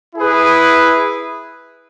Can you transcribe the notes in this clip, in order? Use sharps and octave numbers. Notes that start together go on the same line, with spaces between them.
E4 G#4 B4